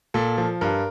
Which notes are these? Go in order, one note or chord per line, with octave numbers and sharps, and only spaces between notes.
A#2 A4
F3
G2 A#4